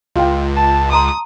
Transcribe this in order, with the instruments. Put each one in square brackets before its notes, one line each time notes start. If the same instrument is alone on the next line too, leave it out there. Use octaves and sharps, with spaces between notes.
[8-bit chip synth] C#2 [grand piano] F4 G5
[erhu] A5
[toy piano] A5 A#5 C6 [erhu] D#6